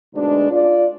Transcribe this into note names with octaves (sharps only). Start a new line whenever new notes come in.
D2 G#2 B2 G#3 D4
F4 D5